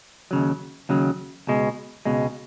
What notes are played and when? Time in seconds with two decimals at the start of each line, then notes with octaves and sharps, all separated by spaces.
0.31 D#2 C#3 F#3
0.89 D#2 C#3 F#3
1.47 C#2 B2 G#3
2.05 C#2 B2 G#3